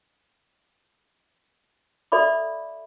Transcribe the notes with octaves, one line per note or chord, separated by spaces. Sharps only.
A4 D5 E5 B5 D6